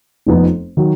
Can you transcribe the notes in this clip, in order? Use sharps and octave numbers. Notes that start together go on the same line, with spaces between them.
F1 F2 F3 B3 D#4
D#3 F#3